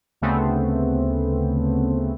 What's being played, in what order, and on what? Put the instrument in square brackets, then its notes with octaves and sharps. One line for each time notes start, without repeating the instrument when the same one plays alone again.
[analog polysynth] D2 C#3 A3 B3 C4